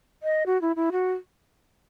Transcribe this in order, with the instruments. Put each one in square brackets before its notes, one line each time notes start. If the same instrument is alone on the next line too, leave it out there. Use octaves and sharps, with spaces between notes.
[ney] D#5
F#4
E4
E4
F#4